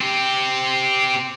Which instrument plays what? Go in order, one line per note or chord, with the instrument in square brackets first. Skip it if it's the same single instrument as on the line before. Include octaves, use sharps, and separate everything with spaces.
[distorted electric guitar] C4 G4